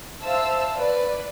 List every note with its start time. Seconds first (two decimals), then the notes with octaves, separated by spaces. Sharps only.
0.23 C5 E5 F5 A5 E6
0.74 B4 D5